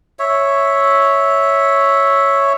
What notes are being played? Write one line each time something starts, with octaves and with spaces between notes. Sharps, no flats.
C#5 E5